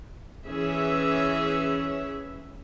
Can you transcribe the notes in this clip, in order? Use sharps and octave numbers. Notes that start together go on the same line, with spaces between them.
E3 C#4 G#4 E5